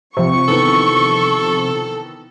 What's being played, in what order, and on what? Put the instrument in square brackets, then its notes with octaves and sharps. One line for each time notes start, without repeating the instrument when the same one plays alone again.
[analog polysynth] C3 F3 [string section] C#6
[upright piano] D#3 E3 B3 [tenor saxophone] A4